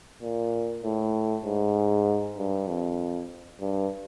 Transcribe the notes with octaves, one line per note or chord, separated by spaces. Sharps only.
A#2
A2
G#2
G2
F2
G2